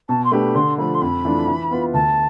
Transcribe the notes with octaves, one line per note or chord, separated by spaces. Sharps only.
B2 A5
C6
A3 D4 G4 B4 B5
D3 C6
F3 A3 B5
C6
F2 B5
E3 A3 D4 F4
E3
B3 F4 B4
D2 A5